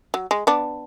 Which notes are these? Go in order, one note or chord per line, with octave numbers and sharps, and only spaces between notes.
F#3
G#3
B3 D4